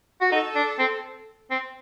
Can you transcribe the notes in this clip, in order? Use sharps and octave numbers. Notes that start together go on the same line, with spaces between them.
F#4
D#4 A4
D4
C4
C4